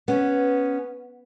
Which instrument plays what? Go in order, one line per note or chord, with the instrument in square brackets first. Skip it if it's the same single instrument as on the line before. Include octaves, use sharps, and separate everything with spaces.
[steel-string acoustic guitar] B3 [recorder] C#4